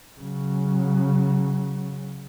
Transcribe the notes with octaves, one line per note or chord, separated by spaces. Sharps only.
C#3 F#3